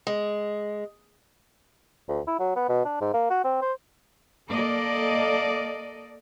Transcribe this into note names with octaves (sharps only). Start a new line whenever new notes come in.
G#3
D2
E4
F#3
B3
B2
D4
G#2
A#3
F#4
C4
C5
A#3 A4 D5 D#5